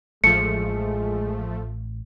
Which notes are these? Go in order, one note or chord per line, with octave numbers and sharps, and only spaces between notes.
A1 A2 F3 G#3 A3 C#7